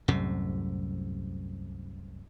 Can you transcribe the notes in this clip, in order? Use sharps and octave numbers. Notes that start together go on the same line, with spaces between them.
C2 F#2 A2 C3